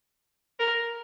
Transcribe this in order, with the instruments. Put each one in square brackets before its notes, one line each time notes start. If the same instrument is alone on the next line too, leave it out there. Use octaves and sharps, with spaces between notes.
[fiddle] A#4